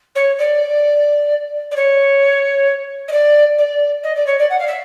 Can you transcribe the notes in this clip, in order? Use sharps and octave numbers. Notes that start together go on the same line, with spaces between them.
C#5
D5
D5
C#5
D#5
D5
D5
D#5
D5
C#5
D5
F#5
F5
E5